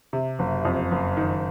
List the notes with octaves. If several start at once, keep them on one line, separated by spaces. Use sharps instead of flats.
C3
F#1
F2
F#1
D#3